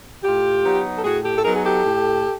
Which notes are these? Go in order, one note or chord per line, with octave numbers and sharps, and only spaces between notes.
A2 F4 G4
F#3 B3 D#4
A4
A2 F#4 G#4
G4 A4
A4
F#3 B3 D#4 G#4 A#4
G#4
G4 A4
A2